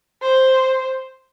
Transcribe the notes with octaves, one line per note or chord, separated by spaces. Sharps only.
C5